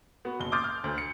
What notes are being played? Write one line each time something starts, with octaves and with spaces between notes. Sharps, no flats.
B3 F#4
F#1 G7
C6 D6 D#6 F6 G6 A6
F6
D2
C#7